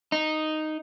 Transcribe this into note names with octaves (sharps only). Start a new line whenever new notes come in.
D#4